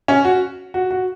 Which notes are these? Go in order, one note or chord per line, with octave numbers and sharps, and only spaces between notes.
C#4
F#4
F#4
F#4